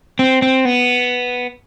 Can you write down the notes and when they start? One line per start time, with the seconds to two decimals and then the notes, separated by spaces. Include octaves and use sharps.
0.19 C4
0.42 C4
0.65 B3